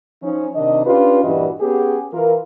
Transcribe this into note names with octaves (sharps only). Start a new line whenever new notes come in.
F3 C#4 D#4
C3 D#3 D4 D#5
C#4 D4 F4 G4 B4
G2 A#2 E3 G3 F#4 D#5
B3 C#4 G4 G#4
E3 F4 A#4